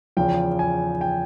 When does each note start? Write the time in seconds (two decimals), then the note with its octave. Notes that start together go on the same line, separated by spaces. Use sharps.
0.17 E2 C#3 F3 G5
0.59 G#5
1.01 G5